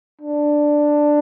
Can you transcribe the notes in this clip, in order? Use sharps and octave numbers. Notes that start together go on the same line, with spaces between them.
D4